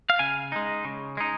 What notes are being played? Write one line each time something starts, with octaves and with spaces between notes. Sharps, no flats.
F5
C#3 G#5
G#3 D#4
C#3
G#3 D#4